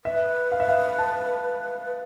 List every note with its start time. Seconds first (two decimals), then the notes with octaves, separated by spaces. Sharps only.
0.04 B4 E5
0.52 F5
0.60 E5
0.68 F5
0.98 A5